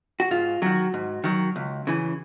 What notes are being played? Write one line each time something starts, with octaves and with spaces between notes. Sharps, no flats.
F#4
G#2 F4
D#3 F#3 F#4
G#2
D#3 F#3
C#2
C#3 E3